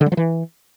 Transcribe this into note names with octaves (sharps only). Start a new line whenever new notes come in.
D3
G3
F3
E3